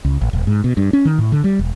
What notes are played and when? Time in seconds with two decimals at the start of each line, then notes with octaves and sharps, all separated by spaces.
0.05 C#2
0.21 A1
0.33 D#1
0.47 G#2
0.64 B2
0.77 G2
0.93 C#4
1.05 D#3
1.19 A2
1.32 D3
1.44 G3
1.59 E1